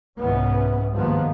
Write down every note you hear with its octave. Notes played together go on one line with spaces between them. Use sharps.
C2 G#2 E3 B3 C#4
G2 D#3 F3 G#3 A#3 B3